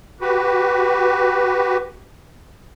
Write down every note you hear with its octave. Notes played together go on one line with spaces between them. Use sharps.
F#4 G4 B4